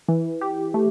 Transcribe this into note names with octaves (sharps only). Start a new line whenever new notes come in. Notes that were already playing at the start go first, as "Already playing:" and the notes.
E3
G4
A3